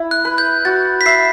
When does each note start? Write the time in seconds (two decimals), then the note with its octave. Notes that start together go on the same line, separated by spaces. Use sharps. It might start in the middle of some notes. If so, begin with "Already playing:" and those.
Already playing: E4
0.11 F#6
0.25 B4
0.38 G6
0.65 F#4 A6
1.01 B6
1.06 E5 C7